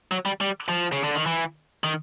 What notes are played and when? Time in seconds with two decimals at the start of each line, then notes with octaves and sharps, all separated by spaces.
0.11 F#3
0.26 G3
0.41 G3
0.69 F3
0.92 C#3
1.04 D3
1.15 D#3
1.26 E3
1.84 D#3